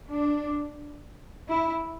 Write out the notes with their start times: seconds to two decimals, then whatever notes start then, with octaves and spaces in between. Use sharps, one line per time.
0.10 D4
1.49 E4